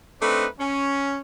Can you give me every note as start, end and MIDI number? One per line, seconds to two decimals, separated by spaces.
0.22 0.46 57
0.22 0.46 60
0.22 0.46 62
0.22 0.46 63
0.22 0.46 71
0.59 1.19 61